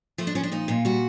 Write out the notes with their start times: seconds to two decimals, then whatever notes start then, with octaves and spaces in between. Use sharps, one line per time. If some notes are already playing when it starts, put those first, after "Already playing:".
0.18 F3 A3
0.27 D4
0.35 F3 C#4
0.43 D4
0.52 A#2 D#4
0.68 A#2 F4
0.85 G3 F#4